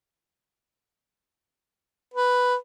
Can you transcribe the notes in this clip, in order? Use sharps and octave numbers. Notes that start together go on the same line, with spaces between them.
B4